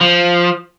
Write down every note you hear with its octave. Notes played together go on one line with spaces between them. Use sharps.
F3